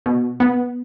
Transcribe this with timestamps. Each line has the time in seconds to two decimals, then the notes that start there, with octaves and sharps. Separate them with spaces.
0.06 B2
0.40 B3